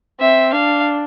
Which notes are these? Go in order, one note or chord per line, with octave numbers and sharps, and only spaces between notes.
C4 E5
D4 F5